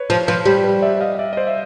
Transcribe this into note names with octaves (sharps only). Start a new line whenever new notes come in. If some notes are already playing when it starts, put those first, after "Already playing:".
Already playing: B4 C#5
F3 C5
F3 B4
G3 C5
B4
D5 E5
E5
D#5 F5
F5
D5 E5
D#5
C5 D5
E5